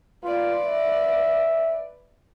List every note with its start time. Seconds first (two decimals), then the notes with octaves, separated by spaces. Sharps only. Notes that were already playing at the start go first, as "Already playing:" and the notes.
0.24 F4 B4 D5
0.65 E5